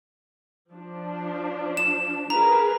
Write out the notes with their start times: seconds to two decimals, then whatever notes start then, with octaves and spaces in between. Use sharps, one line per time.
0.71 F3 D4
1.77 E7
2.30 G#4 A#4 B4 A#5